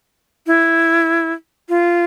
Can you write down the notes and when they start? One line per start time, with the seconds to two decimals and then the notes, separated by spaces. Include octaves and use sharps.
0.47 E4
1.69 F4